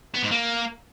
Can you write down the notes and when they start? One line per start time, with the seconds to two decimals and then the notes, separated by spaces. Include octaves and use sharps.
0.14 B3
0.23 G#2
0.31 A#3